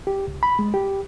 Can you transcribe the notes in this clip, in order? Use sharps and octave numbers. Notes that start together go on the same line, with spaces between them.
G4
C#2
B5
G#3
G4